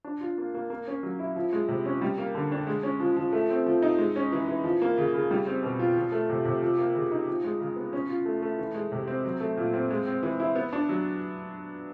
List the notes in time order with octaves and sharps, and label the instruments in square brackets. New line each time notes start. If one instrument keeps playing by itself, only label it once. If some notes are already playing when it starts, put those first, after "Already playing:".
[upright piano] D4
F4
A#3
A#3
A#3
C#4
F#3
E4
F3
G#3
C3
C#4
G3
A#3
D3
D4
G#3
C#4
F3
F3
A3
C4
F3
D#4
G#3
C#4
E3
E3
F3
A#3
C#3
C#3
G3
C4
B2
F4
F3
A3
C3
C3
F3
A#3
C#3
D#4
F3
G#3
C#3
B3
C#4
F4
A3
A3
E3
G#3
C3
C4
F#3
A3
A#2
C4
G#3
C4
E3
E4
B3
D4
F#3